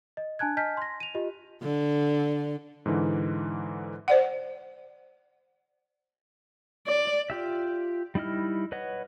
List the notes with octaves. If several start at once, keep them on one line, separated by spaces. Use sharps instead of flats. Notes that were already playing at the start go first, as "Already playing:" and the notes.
D#5
D4 G#5 A5 F#6 G#6
D#5 G#5 A5 F6 G6 B6
C6 A#6
D#7 F7
F4 G4 D#5
D3
G#2 D3 E3
C5 D5 F#5
D5
F4 G4 E5
G3 D#4 E4 D#5 F6
B4 C#5 D#5 F#5